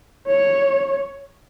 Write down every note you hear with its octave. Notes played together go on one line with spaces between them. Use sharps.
C#5